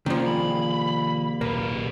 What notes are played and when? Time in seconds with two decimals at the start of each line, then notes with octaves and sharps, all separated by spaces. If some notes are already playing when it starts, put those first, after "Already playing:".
0.06 C2 D#3 F3 A#3 C4 C#4
0.26 G#4 B5
1.41 D#1 B1 A#2 A#3 B4